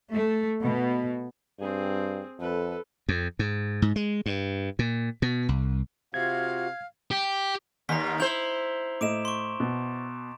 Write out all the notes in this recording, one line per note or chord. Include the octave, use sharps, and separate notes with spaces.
A3
B2
G2 C4 G#4
F2 A4 B4
F2
G#2
G#2
G#3
G2
A#2
B2
C2
C3 F4 F#4 F5 G#6
G4
D#2 D#3 A#5 B6
E4 C5 G6 F7 G7
A2 D#5 D6 D7 E7
C6 C#6
B2